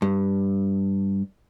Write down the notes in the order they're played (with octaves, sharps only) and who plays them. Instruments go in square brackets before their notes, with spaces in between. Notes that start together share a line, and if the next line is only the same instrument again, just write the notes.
[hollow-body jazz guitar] G2